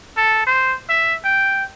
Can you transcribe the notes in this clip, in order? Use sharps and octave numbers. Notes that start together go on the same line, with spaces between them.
A4
C5
E5
G5